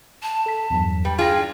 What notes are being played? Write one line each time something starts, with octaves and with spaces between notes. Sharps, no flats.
A5
A4 B6
E2 G2 F#3
G3 B4 G5
D4 F4 G#4 G5 C6 A#6